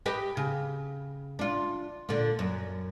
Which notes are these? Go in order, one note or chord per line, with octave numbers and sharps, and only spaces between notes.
G4 B4 D#5
C#3
D4 F4
A#2 D3
F#2